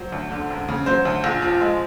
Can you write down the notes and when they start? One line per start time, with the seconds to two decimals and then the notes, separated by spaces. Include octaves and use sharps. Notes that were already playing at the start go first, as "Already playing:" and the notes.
Already playing: F#3 C5
0.12 D2
0.31 D3
0.50 E1
0.69 C#3
0.86 F#3 C5
1.05 D2
1.24 A#1
1.42 F3
1.61 G#3